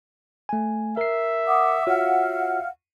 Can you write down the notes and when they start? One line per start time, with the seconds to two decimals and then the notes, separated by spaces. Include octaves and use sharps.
0.49 A3 G#5
0.97 A#4 E5 C7
1.47 F#5 D6 D#6
1.87 F4 F#4 C#5 F5 F#5 F6